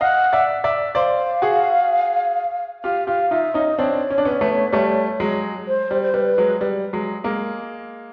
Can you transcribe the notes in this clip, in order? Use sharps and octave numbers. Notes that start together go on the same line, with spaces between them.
D#5 F5 F#5
D5 E5
D5 E5
C5 D5 F5
F#4 G#4
F4 G4 F5
F4 G4 F5
D#4 F4 E5
C#4 D#4 D#5
C4 D4 C#5
C#4
D4
B3 C#4
A3 B3
G3 A3
F#3 G#3
C5
G3
C5
G3 B4
F#3 G#3
G3
F#3 G#3
G#3 A#3